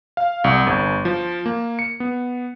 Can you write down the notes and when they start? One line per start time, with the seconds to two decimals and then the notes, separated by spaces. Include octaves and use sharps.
0.17 F5
0.44 C2
0.67 G1
1.05 F3
1.46 A#3
1.79 C#7
2.00 B3